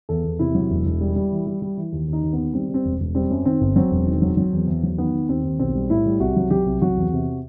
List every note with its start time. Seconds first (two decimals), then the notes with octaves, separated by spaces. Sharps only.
0.09 E2 A4
0.24 E2
0.39 C3 E4
0.55 F#3
0.70 E1
0.85 E1
1.01 G3
1.16 G3
1.32 E3
1.47 G3
1.62 G3
1.77 E3
1.92 D#2
2.08 D#2
2.13 D#4
2.23 D#2
2.33 B3
2.38 D#3
2.53 G3 C4
2.69 G3 C4
2.85 E1
3.00 E1
3.15 G3 C4
3.30 F#2
3.45 D#3 C4
3.61 G1
3.76 F#3 C4
3.91 E1
4.06 D#3
4.22 F#3
4.37 F#3
4.53 E2
4.68 E2
4.83 F#3
4.98 D#3 B3
5.13 D#3
5.29 D#2 C4
5.44 D#2
5.59 B1 C4
5.75 G3
5.90 A2 E4
6.06 G3
6.20 C2 F#4
6.36 F#3
6.50 F#3 G4
6.66 C2
6.82 F#3 F#4
6.97 E2
7.13 C3